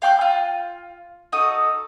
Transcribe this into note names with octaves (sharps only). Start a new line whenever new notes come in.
F5 G5 D6 F#6
F4
D#4 F#4 A4 D#6